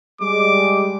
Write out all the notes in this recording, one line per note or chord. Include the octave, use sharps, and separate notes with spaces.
G3 G#3 D6